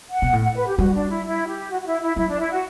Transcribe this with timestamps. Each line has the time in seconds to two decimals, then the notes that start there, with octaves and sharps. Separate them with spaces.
0.10 F#5
0.22 B2
0.33 A2
0.44 F#5
0.56 B4
0.67 G4
0.78 G3 F#4
0.94 D4
1.09 E4
1.25 E4
1.47 G4
1.71 F#4
1.81 F#4
1.86 E4
2.02 E4
2.17 F#3 E4
2.28 D4
2.39 E4
2.52 F#4